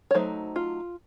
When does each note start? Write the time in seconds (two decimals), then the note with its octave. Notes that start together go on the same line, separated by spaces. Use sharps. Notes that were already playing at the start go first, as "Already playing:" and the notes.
0.11 C#5
0.14 F#3 A3 D#4 C5
0.56 F4